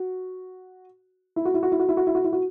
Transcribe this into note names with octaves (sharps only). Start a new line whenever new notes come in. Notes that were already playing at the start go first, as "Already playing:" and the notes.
Already playing: F#4
E4
F#4
E4
F#4
E4
F#4
E4
F#4
E4
F#4
E4
F#4